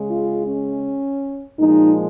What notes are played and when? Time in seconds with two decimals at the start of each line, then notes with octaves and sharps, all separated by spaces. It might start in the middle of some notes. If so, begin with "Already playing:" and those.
Already playing: C#3 G#3
0.11 F4
0.48 C#4
1.59 A#2 F3 G#3 D#4